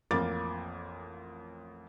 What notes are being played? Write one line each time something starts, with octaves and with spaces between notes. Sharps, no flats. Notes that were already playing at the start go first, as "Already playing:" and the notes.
A1 F2 A#3 D6 A6